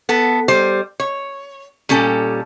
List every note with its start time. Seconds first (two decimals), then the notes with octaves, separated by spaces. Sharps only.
0.09 B3 A4
0.48 G3 C5
1.00 C#5
1.89 A#2 G3 C#4 A4